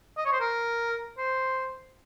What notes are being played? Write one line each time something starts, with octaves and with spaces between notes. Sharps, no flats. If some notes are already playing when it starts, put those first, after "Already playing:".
D#5
C#5
C5
A#4
C5